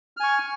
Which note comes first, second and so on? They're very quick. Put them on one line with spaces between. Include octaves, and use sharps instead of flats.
F6 G#5 C#6